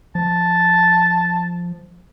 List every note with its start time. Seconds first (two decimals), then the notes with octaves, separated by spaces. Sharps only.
0.15 F3 A5